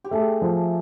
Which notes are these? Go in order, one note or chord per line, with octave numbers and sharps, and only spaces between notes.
G4
A3 G#4
F3